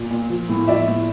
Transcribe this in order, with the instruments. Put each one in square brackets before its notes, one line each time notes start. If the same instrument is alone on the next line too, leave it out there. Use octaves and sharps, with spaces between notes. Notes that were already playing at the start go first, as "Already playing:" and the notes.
Already playing: [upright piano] A#2
A#2
F3
A2
F3 D5 E5
A2